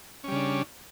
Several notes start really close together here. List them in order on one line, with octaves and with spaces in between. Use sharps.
C#4 G3 C#3 D4